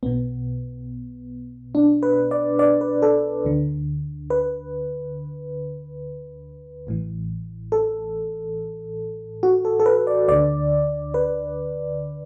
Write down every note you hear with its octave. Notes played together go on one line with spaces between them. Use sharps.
B1 B2 B3
D4
B4
D5
D5
B4
A4
D2 D3
B4
A1 A2 E3
A4
F#4
A4
A4
B4
D5
D2 D3 D5
B4